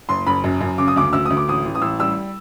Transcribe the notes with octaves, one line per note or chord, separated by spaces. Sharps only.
F#1 C6
F#1 B5
F#2
F#2
C#3 D6
D#6
D2 D6
D2 E6
D2 D#6
D6
A1 D#6
A1
D#6
A1 E6
G3 E6